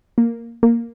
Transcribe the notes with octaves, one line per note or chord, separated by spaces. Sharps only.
A#3
A#3